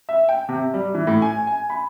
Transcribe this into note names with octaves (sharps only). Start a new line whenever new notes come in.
E5
G5
C3
G3
E3
A2
G#5
G#5
B5